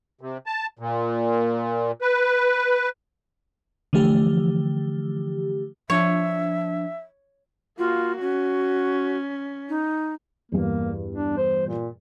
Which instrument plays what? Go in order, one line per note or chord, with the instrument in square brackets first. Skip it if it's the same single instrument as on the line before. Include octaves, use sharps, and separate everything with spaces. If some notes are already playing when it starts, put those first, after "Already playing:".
[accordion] C3
A5
A#2
B4
[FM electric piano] D3 E3 F3 A3 G4
[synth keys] F3 D4 [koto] C#5 [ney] E5
[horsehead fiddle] A#3 F#4 [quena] F4
[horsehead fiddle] C#4 [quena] F#4
[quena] D#4
[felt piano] E2 G2 [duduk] A#3
[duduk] D4
C5
A#2